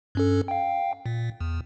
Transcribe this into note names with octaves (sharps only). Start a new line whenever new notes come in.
G2 C#4 A4
F5 G5
A#2
E2